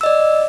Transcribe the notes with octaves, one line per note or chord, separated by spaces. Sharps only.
D5 D#5 E6